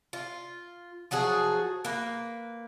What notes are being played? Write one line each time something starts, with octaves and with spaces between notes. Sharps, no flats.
F4
F3 F#3 F#4 G#4
A#3 B4